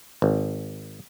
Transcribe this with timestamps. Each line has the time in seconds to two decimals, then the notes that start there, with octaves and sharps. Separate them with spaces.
0.22 G#1